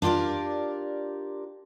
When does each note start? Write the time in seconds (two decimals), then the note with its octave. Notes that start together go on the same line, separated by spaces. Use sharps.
0.02 D4 F4 G4 A#4 D5